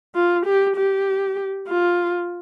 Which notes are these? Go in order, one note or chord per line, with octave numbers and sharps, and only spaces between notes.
F4
G4
G4
F4